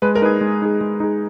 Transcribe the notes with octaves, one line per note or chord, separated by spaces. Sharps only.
G#3 B4
A#4
D#4 G#4 B4
G#3
D#4 G#4
G#3
D#4 G#4